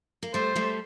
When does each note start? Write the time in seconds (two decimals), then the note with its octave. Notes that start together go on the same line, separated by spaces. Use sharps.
0.23 A#3
0.34 G3 A3 C5
0.56 G3 A3